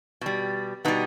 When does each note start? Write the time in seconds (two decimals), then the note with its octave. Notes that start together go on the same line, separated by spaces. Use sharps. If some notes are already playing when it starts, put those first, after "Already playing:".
0.21 B2 G3
0.85 B2 G3 B3 D#4